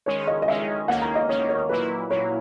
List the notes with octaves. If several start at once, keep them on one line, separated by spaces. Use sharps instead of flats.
D#3 G#3 C#4 C#5
D#5
D#5
D#3 G#3 C#4 E5
D#2 D#3 A#3 C#4 F#5
A#5
D#5
D#2 D#3 A#3 C#4 C#5
C#5
A#2 F#3 A#3 E4 B4
A#2 F#3 A#3 E4 C#5